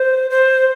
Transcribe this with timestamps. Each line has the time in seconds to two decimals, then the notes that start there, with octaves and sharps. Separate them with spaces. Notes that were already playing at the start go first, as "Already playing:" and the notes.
Already playing: C5
0.30 C5